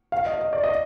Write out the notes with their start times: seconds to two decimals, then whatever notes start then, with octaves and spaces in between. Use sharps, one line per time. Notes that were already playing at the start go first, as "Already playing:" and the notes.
0.12 F5
0.26 D#5
0.41 D#5
0.53 D5
0.64 D#5